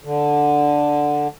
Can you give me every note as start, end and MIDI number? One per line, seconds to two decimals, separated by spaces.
0.04 1.28 50